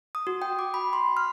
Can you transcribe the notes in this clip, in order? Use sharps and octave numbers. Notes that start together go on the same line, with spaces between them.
D#6
F#4
G5
D6
B5
C6
F6